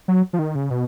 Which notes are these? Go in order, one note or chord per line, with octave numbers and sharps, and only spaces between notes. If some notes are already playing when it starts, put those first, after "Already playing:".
F#3
F3
D#3
C#3
B2